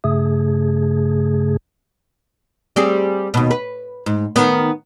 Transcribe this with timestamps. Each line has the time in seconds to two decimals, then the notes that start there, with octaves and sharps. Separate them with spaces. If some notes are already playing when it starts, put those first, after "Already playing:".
0.04 G2 C#3 A3 G#4
2.76 G3 C4 G#4
3.34 D#2 B2
3.51 B4
4.06 G#2
4.36 D#3 B3